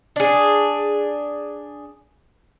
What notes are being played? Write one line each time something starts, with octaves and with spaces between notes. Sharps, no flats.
D4 G#4